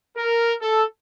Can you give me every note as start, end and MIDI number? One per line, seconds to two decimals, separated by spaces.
0.17 0.54 70
0.62 0.85 69